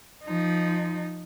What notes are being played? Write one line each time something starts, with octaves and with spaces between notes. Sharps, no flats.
F3 D#4